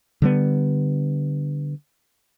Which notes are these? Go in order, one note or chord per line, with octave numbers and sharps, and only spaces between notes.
D3 G3 B3